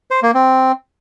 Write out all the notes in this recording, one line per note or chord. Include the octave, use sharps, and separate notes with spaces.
C5
A#3
C4